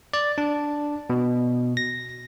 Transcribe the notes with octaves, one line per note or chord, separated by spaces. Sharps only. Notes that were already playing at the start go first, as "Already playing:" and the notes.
D5
D4
B2
A#6